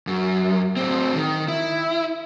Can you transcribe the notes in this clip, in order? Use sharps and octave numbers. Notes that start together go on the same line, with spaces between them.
F#2
A2 C4
D#3
E4